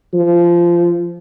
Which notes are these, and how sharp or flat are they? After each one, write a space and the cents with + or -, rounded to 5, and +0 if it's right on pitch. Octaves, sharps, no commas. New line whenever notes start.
F3 -20